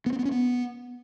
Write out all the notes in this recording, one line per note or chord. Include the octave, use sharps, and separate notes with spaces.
B3
C4
B3
C#4
B3